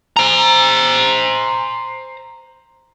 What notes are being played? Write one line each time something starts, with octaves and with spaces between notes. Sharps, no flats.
C5 A#5